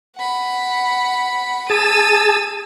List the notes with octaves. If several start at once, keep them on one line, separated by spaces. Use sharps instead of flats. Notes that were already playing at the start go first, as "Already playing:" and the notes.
F#5 B5
G#4 A5 E6 D#7